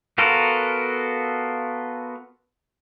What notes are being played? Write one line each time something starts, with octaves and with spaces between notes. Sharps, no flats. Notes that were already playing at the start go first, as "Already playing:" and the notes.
B3 F4 F#4 A4 A#4